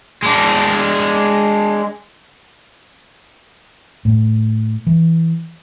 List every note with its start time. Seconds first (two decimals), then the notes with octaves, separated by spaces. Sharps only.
0.23 G#3 D4
4.05 A2
4.87 E3